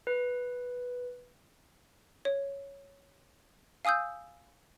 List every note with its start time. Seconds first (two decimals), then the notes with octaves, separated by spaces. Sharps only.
0.07 B4
2.25 C#5
3.85 F5 G#5 D#6 E6 G6